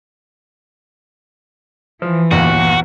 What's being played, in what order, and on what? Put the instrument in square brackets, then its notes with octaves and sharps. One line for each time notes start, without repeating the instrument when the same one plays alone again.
[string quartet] E3 [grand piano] F3
[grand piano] G1 D#2 A#2 [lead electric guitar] F#4